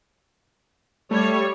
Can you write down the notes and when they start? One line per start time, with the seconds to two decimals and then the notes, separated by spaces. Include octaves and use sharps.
1.11 G3 A3 C#5